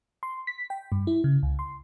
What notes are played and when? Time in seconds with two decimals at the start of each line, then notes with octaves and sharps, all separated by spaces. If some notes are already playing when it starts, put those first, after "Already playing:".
0.23 C6
0.47 B6
0.70 G5
0.92 G2
1.07 E4
1.24 C#3
1.43 C#2
1.59 C6